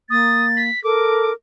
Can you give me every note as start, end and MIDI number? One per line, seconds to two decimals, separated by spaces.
0.10 0.70 58
0.10 0.46 87
0.10 0.62 93
0.57 0.82 95
0.84 1.31 69
0.84 1.33 70
0.84 1.31 86